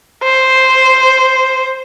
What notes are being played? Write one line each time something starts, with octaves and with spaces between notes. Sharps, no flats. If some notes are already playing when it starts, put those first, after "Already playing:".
C5